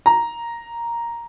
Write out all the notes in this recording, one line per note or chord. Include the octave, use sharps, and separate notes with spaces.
A#5